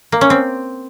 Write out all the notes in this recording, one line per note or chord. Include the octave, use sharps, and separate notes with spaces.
A#3
C#4
C4